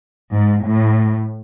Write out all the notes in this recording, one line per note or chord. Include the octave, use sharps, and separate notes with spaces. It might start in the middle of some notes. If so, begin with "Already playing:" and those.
G#2
A2